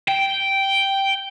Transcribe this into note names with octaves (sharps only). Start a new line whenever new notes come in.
G5